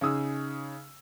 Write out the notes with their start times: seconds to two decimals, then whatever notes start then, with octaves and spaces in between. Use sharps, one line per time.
0.01 C#3 D#4 G#4 D#6 E6